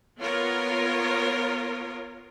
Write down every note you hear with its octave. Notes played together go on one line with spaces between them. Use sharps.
B3 F4 A#4 C#5